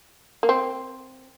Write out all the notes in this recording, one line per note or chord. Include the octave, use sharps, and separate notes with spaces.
A#3
C4